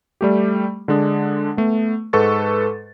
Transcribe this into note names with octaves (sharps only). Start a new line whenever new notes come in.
G3 A3 G4
D3 G#3 D4 D#6
A3 B3
G#2 A4 B4 C#6 A6